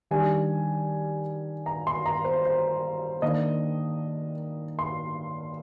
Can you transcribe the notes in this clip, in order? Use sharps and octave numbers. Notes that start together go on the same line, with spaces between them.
D#3 G3 D4 G#5
A#5
C6
A#5
C5
C5
D#3 A#3 D4 D#5
C6